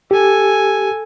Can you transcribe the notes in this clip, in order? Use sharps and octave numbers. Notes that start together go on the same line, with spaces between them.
G4 A4 G#5